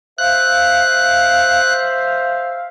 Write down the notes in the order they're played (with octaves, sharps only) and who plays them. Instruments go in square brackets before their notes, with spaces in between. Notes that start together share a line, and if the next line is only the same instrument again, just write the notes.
[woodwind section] C5 E5 F5 [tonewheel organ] F#6